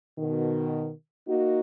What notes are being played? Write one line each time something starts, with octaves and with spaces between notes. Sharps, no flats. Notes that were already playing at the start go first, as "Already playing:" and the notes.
B2 D#3
A#3 D#4 F#4